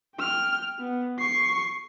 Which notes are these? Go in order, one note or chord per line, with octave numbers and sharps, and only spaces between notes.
G5 F6
B3
C#6 C7